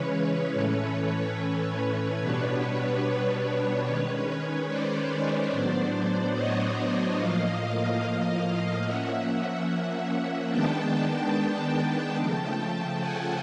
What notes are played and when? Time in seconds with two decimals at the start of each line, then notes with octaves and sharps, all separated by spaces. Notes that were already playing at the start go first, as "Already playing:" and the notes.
Already playing: C#3 E3 G#3 C#4 B4 C#5
0.53 A2 E3 A3 C#4
2.19 B2 G3 B3 D4 B4 C#5
3.02 B4 C#5
3.86 D#3 G#3 C#4
4.68 C5 D5
5.51 A2 F#3 B3 D4
6.35 C#5 D#5
7.17 A2 F3 A#3 D#5 F5
8.84 F3 A#3 C#4 E5 F#5
10.50 D#3 G#3 B3 D4 G5 A5
12.16 C#3 F3 A3 G5 A5
12.99 F#5 G#5